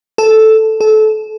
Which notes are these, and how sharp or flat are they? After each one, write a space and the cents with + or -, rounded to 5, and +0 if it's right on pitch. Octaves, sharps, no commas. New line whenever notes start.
A4 -5
A4 -25